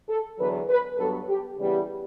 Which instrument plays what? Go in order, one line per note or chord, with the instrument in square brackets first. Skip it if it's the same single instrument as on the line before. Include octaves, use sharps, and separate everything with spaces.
[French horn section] A4
E2 D3 F#3 B4
B4
G2 F#3 B3 A4
G4
C#3 E3 G3 B3